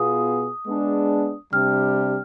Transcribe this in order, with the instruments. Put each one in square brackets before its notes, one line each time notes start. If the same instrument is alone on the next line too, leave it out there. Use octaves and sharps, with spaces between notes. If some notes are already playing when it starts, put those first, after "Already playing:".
Already playing: [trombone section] B2 B3 F4 G#4 [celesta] D#6
[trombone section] G#3 B3 D4 G#4
[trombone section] C3 G3 D4 G4 [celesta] F6